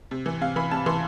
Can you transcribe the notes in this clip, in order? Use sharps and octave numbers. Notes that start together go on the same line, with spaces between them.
C3
E3
C3 F5
E3 B5
C3 A5
E3 C6